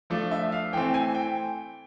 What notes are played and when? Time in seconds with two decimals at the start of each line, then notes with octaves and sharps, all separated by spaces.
0.10 F3 A3 D4
0.31 E5
0.52 F5
0.73 E3 A3 C4 G5
0.94 G#5
1.15 G5